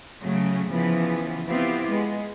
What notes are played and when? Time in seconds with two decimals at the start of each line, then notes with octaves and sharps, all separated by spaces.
0.22 C#3 F#3 A3
0.70 C#3 E3 F3 B3
1.47 B3 C4 E4 F4 G4
1.88 G#3 B3